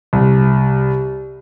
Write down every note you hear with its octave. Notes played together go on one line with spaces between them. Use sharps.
C2